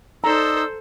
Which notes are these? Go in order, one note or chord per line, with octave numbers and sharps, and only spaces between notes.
D#4 A4 C5 D5 A#5 E6